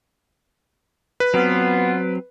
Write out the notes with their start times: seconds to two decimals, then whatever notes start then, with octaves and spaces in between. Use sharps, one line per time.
1.20 B4
1.34 F#3 B3 C4 F4